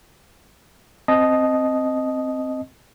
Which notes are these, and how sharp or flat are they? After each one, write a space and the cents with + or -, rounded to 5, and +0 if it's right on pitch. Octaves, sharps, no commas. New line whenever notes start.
C4 +0 D#5 +0 A5 -25